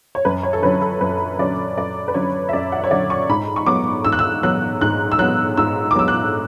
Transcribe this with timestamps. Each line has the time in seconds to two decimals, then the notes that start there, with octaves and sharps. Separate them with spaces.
0.15 C#5
0.25 F#2 B4
0.43 C#5
0.53 A4
0.62 D3 F#3 C#4 B4
0.81 A4
1.01 F#2 B4
1.38 D3 F#3 C#4 D5
1.77 F#2 D5
2.08 B4
2.14 D3 F#3 C#4 C#5
2.49 E5
2.53 F#2 D5
2.72 F#5
2.84 C#5
2.91 D3 F#3 C#4 D5
3.10 C#6
3.29 G#2 B5
3.56 C#6
3.66 F#3 B3 D6
4.04 G#2 E6
4.12 F#6
4.19 E6
4.43 F#3 B3 F#6
4.81 G#2 F#6
5.12 E6
5.19 F#3 B3 F#6
5.57 G#2 E6
5.91 D6
5.95 F#3 B3 E6
6.08 F#6